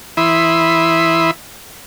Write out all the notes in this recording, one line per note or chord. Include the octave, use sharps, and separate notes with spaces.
E3 E4 E5 B5 C6 D#6